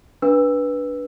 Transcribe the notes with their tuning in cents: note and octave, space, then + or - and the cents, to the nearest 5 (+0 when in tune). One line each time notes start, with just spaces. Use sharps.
D4 -10 B4 -10 E6 +5